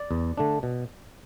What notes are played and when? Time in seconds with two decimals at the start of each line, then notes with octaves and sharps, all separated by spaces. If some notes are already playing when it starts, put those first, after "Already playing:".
Already playing: D5
0.11 E2
0.37 D3 A3 D4
0.63 B2